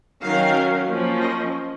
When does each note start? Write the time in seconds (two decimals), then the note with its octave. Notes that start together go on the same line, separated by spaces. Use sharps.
0.22 D#3 F#3 C#4 F5
0.88 F3 A#3 C#4
1.21 D#5